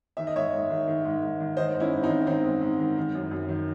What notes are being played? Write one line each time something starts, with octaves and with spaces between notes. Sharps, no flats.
D#3 E5
D#5
G#2 C#5 E5
G#2
D#3
D#3
G#2
G#2
D#3
D#3 C5 D#5
G#2
C#4 E4
G#2
C4 D#4
D#3
D#3 C4 D#4
G#2
G#2
D#3
D#3
F#2
F#2
D#3